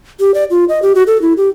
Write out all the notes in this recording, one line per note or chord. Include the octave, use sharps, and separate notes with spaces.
G4
D5
F4
D#5
G4
F#4
A4
E4
G4